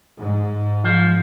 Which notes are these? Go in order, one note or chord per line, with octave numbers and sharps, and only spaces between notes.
G#2
F3